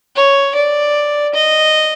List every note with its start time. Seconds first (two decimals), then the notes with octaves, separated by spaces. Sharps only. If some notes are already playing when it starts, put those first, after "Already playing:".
0.16 C#5
0.55 D5
1.35 D#5